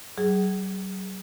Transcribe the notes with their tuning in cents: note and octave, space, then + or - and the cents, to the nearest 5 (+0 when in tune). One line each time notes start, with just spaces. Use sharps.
F#3 +45 G#4 +0